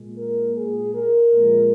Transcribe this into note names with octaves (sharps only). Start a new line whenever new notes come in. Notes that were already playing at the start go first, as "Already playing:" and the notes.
Already playing: A#2 G#3
A#4
G#4
A#4
A#2 F3 G#3